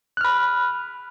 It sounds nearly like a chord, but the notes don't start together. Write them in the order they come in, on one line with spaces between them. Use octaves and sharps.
F#6 F6 B5